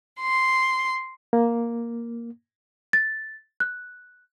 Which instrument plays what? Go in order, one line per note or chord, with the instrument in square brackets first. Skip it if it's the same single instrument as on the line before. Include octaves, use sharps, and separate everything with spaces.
[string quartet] C6
[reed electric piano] A#3
[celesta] A6
F#6